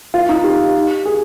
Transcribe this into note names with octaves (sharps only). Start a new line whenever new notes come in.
F4
D#4
G4
G#4